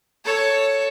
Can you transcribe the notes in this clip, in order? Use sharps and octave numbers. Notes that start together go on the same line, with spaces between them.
A4 C#5